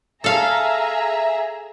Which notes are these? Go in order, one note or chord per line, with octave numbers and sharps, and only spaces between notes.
G#4 A4 E5 F5 A#5